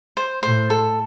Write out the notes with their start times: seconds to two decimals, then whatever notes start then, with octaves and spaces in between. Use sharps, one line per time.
0.17 C5
0.43 A2 C5
0.70 A4